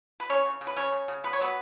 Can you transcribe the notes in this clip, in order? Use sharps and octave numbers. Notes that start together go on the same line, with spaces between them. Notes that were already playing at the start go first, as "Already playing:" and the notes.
B4
E3 C#4 C#5
C#3
C#3
B4
C#3 C#4 C#5
C#3
C#3
B3 B4
C#5
F#3 B3 B4